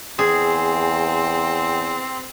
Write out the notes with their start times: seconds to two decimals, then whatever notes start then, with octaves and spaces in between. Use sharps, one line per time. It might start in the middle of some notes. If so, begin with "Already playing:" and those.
0.19 E2 C4 G#4